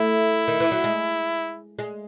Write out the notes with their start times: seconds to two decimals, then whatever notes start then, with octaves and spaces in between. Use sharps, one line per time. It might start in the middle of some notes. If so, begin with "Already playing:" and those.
Already playing: A3 E4
0.48 D#3
0.60 E3
0.71 F#3
0.84 G#3
1.79 G#3